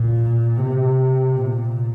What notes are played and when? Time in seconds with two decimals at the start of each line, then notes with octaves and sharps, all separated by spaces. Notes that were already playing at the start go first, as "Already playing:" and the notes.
Already playing: A#2
0.58 C3
1.36 A#2